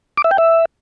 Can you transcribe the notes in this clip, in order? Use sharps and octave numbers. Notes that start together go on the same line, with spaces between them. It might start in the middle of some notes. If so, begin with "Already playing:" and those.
D6
E5
G5
E5